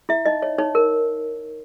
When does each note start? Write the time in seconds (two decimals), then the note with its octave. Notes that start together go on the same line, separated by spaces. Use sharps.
0.09 E4 E5
0.25 D#4 D#5
0.42 C#5
0.59 D#4 C#5
0.75 A#4